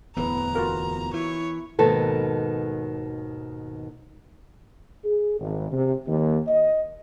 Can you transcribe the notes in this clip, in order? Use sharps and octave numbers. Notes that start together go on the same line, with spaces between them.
D1 E2 E3 B3 B4 A#5
F4 F#4 A#4
E3 E4 C#5
D#2 G#2 B2 D#3 A4 B4
G#4
G#1
C3
D#2
D#5